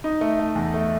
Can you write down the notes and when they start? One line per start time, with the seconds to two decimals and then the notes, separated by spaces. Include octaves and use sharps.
0.04 D#4
0.21 A3
0.39 A3
0.55 E2
0.74 A3